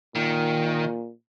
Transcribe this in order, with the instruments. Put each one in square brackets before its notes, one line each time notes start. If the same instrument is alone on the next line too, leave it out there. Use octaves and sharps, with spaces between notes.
[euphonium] A#2 [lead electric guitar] D#3